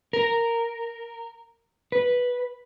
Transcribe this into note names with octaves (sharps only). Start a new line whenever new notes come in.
A#4
B4